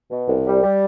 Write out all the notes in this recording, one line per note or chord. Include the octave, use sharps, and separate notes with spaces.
B2
C2
G3
G3